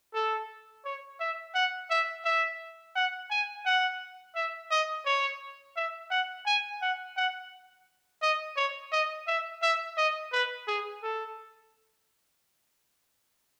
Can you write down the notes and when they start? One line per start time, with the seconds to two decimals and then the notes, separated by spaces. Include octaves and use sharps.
0.14 A4
0.85 C#5
1.20 E5
1.55 F#5
1.90 E5
2.25 E5
2.96 F#5
3.31 G#5
3.66 F#5
4.36 E5
4.71 D#5
5.06 C#5
5.76 E5
6.11 F#5
6.46 G#5
6.82 F#5
7.17 F#5
8.22 D#5
8.57 C#5
8.92 D#5
9.27 E5
9.62 E5
9.97 D#5
10.33 B4
10.68 G#4
11.03 A4